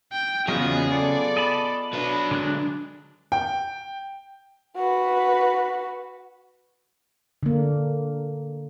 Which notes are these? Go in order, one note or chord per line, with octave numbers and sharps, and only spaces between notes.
G5
E2 C#3 F#3 B3 F4 G#4 D#5
B3 F4 A4 D5
D#5 A5 B5
F#3 D4 B4
D3 G#3 F#6
G5
F#4 B4
D3 A#3